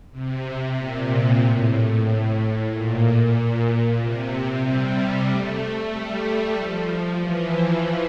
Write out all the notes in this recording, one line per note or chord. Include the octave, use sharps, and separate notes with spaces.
C3
A#2
A2
A2
A#2
C3
G3
A3
G3
F3
E3